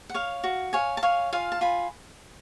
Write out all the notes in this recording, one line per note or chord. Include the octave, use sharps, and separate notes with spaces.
F#5
C#5 F5
F#4
C#5 F5 G#5
A5
C#5 F5 G#5
F4 F5 G#5
A5
F4 G#5 B5